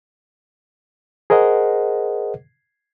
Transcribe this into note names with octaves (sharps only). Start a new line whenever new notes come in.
G#4 A#4 C5 D#5 F#5